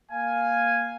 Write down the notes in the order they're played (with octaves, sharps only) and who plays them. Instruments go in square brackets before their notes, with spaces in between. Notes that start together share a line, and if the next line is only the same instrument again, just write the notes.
[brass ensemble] A#3 F5 G#5